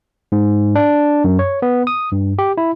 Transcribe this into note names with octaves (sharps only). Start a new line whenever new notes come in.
G#2
D4
F#2
C#5
B3
D#6
G2
G4
E4